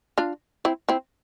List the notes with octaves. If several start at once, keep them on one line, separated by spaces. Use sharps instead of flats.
D4 F4
C4 E4
C4 E4